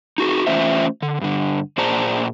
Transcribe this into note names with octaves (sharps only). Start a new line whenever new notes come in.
D#4 F#4 G#4
E3 A3 C#4 F4 C5 E5
D3
G2 D3
A#2 G#4 C5 D5 A5 A#5